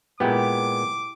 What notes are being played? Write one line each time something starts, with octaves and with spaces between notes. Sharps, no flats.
A#2 G#3 B3 E4 G4 D6